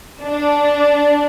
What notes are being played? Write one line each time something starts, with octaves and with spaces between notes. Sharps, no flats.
D4